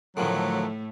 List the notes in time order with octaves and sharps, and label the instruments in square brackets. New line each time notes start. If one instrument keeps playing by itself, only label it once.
[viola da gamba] A2 A3 [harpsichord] D3 D#3 F3 [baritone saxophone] F#3